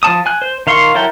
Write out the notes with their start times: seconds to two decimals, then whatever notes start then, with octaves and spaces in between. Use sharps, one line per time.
0.03 F3 C#4 A5 D#6
0.26 G#5 F#6
0.42 C5
0.67 D#3 F5 C6 C#6
0.95 F#3 E4 A4 A#4 G5